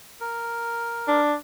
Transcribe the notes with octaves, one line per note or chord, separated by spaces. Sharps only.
A#4
D4